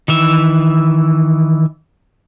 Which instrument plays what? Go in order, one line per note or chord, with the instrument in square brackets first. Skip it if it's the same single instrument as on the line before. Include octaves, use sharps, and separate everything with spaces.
[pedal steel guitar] D#3 E3 E5